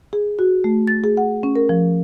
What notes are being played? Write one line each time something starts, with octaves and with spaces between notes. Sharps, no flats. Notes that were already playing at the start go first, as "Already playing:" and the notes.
G#4
F#4
A3
A6
G#4
F#5
C#4
A#4
F3